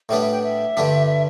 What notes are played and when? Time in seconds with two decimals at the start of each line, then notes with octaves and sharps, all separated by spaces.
0.09 A2 G3 B3 D4 E5
0.20 E5
0.32 G5
0.43 E5
0.77 G2 D3 G3 D4